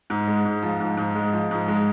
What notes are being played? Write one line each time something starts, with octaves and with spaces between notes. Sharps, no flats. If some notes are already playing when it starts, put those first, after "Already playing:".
G#2
G#3
G#2
F3
G#2
G#2
G#3
F3
G#2
G#3